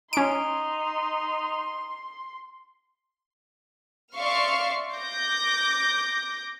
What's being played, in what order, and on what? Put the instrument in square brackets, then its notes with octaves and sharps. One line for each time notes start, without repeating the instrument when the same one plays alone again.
[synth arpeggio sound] C#4 D7 [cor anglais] D#4 [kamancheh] C6
[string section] D5 E5 F5 C6 C#6 F6
D6 G6 A#6